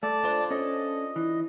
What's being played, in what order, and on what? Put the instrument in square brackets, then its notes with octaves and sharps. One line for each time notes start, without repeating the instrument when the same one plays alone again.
[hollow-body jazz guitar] A3 [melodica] D5 A5
[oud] D4 F4 C5
[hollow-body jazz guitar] C#4 A4 [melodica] D#5
[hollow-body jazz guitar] E3